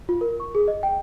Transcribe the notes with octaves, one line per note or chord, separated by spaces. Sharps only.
F4
A#4
C#6
G#4
D#5
G5